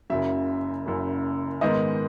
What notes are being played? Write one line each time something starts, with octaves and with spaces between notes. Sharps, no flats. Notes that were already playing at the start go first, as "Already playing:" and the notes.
F#1 F#2 C#3 F#3 E5
F#1 F#2 C#3 F#3
G#2 D#3 G#3 B3 D#5